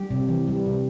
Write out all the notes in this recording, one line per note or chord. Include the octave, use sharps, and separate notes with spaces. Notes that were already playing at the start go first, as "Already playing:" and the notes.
Already playing: G3 G4
C3
E3
G3
C3